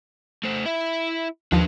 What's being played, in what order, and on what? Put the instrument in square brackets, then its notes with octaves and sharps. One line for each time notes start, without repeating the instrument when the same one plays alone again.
[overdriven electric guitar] A3 C5
E4 E5
[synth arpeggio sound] D#2 F3 [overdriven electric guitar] D4 B4